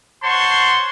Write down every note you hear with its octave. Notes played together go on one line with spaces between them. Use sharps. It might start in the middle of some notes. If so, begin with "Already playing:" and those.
C5 C#5 F#5 A5 C6 C#6